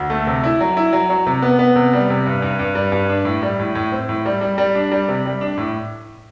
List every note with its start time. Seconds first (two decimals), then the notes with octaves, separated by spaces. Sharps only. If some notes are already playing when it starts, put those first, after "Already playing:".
Already playing: D2
0.10 A3
0.27 C3
0.44 E4
0.61 F#3
0.77 E4
0.93 F#3
1.10 F#3
1.26 C3
1.42 B3
1.59 B3
1.76 C3
1.93 G3
2.10 C3
2.26 G2
2.42 G2
2.59 G2
2.75 G3
2.92 G2
3.10 D4
3.25 A2
3.43 G3
3.59 A2
3.75 A2
3.92 C4
4.09 A2
4.26 G3
4.41 G3
4.58 G3
4.75 D4
4.92 G3
5.08 C3
5.25 G3
5.41 D4
5.58 A2